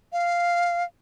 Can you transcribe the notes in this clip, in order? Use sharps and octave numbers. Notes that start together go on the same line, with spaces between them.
F5